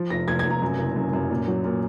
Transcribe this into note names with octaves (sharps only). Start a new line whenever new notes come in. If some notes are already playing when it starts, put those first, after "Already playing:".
Already playing: F3
F1 A#6
F1 G#6
G#6
F1
A#5
F#2
F#1
F#2
F#2
A#2
F#3
A#2